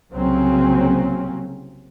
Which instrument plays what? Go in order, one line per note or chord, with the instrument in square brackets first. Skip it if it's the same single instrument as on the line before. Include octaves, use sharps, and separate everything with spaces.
[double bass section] C2 C#3 F#3 A#3 C4 C#4